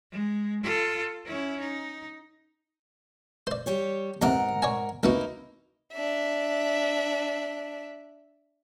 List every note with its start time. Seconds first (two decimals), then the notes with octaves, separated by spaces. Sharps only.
0.11 G#3
0.63 F4 A4
1.25 C#4 E4
1.60 D#4
3.47 C5 D5
3.66 G3 G4 C#5
4.22 E2 G#2 C3 A#4 F#5
4.62 C#5 D5 G#5
5.03 C2 A#3 B3 D#4 E4 F#4
5.93 D4 E5